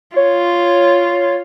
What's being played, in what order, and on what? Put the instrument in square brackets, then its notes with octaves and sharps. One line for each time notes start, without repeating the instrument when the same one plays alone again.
[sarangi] F4 [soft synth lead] C#5